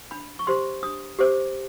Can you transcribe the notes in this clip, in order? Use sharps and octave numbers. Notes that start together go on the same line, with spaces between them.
D4 B5
C#6
G4 C5 C6
D4 D#6
G4 C5 D6